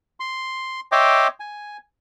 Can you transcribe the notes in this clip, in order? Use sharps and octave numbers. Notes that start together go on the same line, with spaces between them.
C6
C#5 D#5 E5 G5 C6 D6
G#5